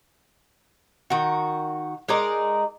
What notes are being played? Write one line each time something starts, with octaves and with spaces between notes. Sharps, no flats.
D#3 F#4
G#3 D#4 A#4 D5